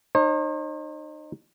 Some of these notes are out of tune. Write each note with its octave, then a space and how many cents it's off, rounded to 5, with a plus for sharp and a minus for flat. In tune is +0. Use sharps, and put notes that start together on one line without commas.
D#4 -30 C5 +45